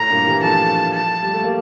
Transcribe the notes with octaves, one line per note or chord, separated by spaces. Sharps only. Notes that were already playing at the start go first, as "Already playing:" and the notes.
Already playing: A2 A#5
G2 A#2
E3 G3
F3 A3 A5
A5
G3
A3
G3 A#3